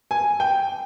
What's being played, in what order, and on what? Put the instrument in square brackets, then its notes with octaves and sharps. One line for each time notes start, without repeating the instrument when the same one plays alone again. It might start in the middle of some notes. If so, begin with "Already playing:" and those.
[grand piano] G#5
G5